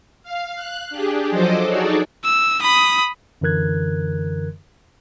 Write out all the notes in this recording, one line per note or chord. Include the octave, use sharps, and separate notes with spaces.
F5
F#6
D4 G4 G#4
F3 F#3 A4 C5 D#5 D6
D#4 F#4 G#4 A4 C#5 D5
E6
B5 D#6
F#2 D3 E3 A#4 F#6 G#6